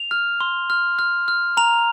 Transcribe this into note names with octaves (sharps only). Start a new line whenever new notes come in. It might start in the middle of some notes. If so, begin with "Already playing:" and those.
Already playing: F7
F6
C6
F6
F6
F6
A#5 F7